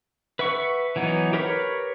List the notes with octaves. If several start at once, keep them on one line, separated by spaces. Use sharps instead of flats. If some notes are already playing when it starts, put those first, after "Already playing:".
B4 E5 F#5 C#6
E3 F#3 B3 D#4
G4 A#4 B4 C#5 B5